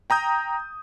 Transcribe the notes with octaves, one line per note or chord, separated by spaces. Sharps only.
G5 A#5 D#6 G6